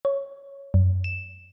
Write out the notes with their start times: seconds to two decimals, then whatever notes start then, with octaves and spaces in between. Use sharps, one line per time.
0.05 C#5
0.74 F#2
1.04 E7